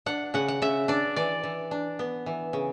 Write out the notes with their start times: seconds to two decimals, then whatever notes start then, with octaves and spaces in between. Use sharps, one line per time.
0.06 D4 F#5
0.34 C#3 F#5
0.48 F#5
0.62 C#3 E5
0.88 D4 D5
1.16 E3 D5
1.44 E3
1.71 D4
1.99 B3
2.26 E3
2.53 C#3